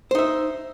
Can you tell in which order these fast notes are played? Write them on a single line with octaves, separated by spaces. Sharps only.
C5 D#4 E5